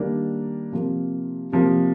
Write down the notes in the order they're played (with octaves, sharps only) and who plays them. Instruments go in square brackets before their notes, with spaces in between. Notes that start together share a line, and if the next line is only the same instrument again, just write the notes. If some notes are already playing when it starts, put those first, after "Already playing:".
Already playing: [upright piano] D#3 G3 A#3 D4
C3 F3 A#3
C3 F3 A#3